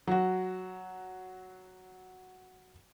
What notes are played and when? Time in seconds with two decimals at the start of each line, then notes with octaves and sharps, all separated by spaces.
0.07 F#3 F#4